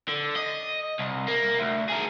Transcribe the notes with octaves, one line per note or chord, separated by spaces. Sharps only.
D3
D#5
C2
A#3
D2
G#4 A#4